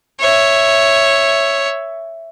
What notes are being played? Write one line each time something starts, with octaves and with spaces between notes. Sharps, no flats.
C#5 E5